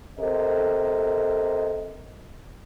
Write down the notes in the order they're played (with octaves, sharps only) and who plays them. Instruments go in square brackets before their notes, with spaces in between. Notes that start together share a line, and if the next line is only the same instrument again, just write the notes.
[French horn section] C3 A4 A#4 D#5